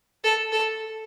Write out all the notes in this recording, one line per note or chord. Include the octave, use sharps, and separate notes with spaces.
A4
A4